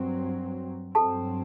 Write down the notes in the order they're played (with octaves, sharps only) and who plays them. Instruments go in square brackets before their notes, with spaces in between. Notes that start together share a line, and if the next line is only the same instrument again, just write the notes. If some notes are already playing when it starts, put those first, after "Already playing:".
Already playing: [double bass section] G2 F#3 C4
[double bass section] G2 F#3 C4 [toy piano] A4 A5